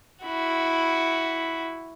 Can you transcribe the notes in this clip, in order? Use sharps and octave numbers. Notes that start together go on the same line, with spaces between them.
E4 F#4